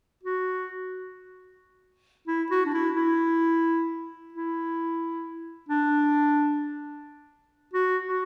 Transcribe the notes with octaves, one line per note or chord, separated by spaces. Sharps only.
F#4
E4
F#4
D4
E4
E4
E4
D4
F#4
F#4